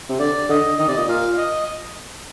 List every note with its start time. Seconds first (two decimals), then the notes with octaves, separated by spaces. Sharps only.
0.09 C3
0.20 D3 D5
0.49 D3 D#5
0.79 D#3 D#5
0.88 C3 D5
0.96 A#2 D#5
1.08 A#2 F5
1.37 D#5